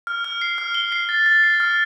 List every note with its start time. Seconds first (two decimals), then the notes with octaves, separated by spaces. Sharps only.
0.07 F6
0.24 F6
0.41 C7
0.58 F6
0.75 G7
0.92 C7
1.09 A6
1.26 A6
1.44 C7
1.60 F6